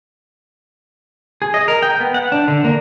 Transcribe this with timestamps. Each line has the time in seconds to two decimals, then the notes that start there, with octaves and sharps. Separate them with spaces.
1.42 G#4
1.54 D#5
1.68 A#4
1.83 G5
2.00 B3
2.14 F#5
2.32 D4
2.48 D3
2.64 A#3